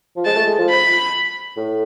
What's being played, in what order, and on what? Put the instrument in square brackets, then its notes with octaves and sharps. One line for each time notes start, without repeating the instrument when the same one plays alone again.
[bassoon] F3
[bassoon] G#3 [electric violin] A5
[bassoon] A3
G#3
F3
[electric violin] B5
[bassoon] A2